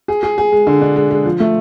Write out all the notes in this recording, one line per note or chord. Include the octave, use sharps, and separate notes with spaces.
G#4
G#4
G#4
G#3
D3
D4
G#3
G#3
F3
A3